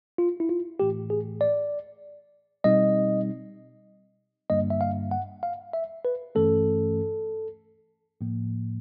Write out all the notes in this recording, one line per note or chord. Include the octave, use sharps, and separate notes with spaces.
F4
E4
F4
A2 E3 A3 G4
G#4
D5
B2 G3 C4 D#4 D#5
G2 D3 G3 A#3 D4 D#5
E5
F5
F#5
F5
E5
B4
G2 E3 A3 C#4 A4
A2 F3 A#3